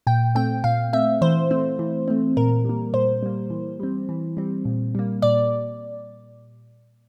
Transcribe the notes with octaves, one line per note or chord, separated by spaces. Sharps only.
A#2 G5
A3 C4 G5
A#2 F5
A3 C4 E5
E3 C5
A3 C4
E3
A3 C4
A#2 A#4
G3 A#3
A#2 C5
G3 A#3
E3
G3 C4
E3
G3 C4
A#2
G3 A#3
A#2 D5